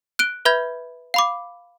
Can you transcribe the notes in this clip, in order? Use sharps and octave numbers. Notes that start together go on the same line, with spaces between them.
F#6 D7 G7
B4 E5 B5 G6 G#6
F5 B5 D6